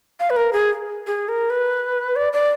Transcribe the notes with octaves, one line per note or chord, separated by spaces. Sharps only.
F5
B4
A#4
G#4
G#4
A#4
B4
D5
D5